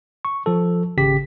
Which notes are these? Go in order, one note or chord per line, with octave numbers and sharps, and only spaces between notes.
C#6
F3 A4
G#1 C#3 G4 B6